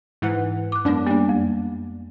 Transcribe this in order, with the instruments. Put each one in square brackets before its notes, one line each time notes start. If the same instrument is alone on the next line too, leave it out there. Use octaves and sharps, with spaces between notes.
[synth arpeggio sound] G#2 E3 F#5
[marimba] D6 F#6
[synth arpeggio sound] F#2 D4 [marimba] G#3 B3
[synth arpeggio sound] G3 D4 [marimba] A#3
[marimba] F2